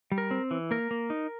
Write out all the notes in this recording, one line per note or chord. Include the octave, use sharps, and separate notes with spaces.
G3
A#4
C4
E3
A#3 A#4
A#3
D#4